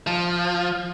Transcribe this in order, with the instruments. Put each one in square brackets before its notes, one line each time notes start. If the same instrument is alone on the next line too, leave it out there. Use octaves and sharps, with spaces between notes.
[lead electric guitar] F3